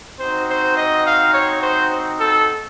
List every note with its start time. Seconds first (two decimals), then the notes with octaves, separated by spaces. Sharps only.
0.19 C4 D#4 F#4 C5
0.48 C5
0.76 D#5
1.05 F5
1.33 C#5
1.62 C5
2.19 A4